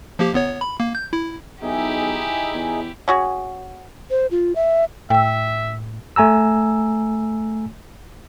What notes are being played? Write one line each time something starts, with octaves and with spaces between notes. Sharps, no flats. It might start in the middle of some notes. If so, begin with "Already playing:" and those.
F3 A#3 G4
G1 B3 C#5
B5
A#3
G6
E4
B1 D#4 E4 G4 G#4 E5
E2
C#4 F#4 G#4
C5
F4
E5
A2 E5 G5 E6
A3 G#5 A#5 E6